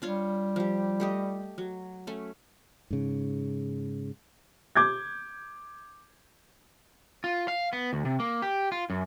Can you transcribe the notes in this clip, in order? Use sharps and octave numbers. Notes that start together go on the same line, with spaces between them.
G3 D4 F4 C#5
F3 G4
A3 G4 D#5
F#3
A3 C#4
G#2 C#3
D6 G6 G#6
F4
F5
B3
D2
C3
A#3
G4
F4
F#2